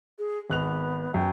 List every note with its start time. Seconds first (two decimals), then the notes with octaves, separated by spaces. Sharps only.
0.19 G#4
0.50 G#1 B3 F#6 F7
1.14 F#2 G5